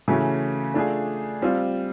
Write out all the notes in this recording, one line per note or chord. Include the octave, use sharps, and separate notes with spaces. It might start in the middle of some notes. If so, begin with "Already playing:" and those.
C#3 E3 A3 C#4 F#4
A3 D4 F4 G#4
G3 C4 F4